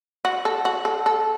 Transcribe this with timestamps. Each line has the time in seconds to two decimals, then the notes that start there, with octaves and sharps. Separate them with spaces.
0.25 F#4
0.45 A4
0.65 F#4
0.85 A4
1.06 A4